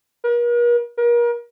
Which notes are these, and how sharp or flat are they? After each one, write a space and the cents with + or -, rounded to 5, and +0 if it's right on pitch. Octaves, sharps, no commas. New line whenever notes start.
A#4 +45
A#4 +35